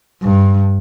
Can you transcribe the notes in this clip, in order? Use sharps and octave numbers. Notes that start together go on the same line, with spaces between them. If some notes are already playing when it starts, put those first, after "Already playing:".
G2